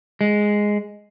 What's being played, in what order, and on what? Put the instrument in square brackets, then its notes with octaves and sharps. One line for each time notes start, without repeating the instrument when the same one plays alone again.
[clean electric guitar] G#3